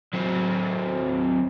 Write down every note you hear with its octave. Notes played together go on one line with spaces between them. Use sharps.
F#3 C4